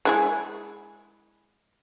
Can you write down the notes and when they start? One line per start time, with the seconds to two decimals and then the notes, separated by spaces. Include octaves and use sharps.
0.05 G#3 E4 G#4